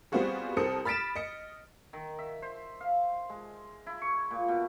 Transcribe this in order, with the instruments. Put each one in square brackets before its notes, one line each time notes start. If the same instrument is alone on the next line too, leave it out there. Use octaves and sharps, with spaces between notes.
[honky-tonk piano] G3 B3 C4 F4 F#4 G#4
C2 C4 A4 A#4 D#6 C#7
B5 F6 A6 B6 D7 E7
D#5 C#7
[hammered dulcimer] D#3
E5
C5
F5
G#3
E4
C#6
A#2
B2